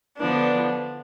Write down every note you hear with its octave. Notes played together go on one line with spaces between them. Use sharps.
D3 F3 B3 D4